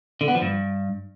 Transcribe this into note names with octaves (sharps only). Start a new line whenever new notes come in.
D3
B3
F3
G2